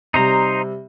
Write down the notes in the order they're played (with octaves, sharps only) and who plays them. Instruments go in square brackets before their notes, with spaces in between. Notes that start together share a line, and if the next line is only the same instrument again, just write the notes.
[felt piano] C3 G3 [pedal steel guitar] D#4 C5 A#5